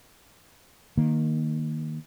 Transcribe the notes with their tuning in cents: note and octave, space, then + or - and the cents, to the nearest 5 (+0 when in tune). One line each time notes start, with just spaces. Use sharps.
D#3 -10 A#3 +0